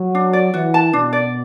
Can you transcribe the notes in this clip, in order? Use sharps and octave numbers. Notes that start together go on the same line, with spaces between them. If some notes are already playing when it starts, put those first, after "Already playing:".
Already playing: F#3
D4
D5
E3 F#4
A5
B2 D4
D5